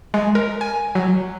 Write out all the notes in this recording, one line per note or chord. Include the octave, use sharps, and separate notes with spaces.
G#3
A#4
G#5
F#3